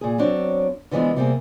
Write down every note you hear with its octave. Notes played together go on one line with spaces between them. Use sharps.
A#2 G#4
F#3 C4 D4 C#5
D3 E3 F3 G#3 B3
C3 G3 A#3 C4 G#4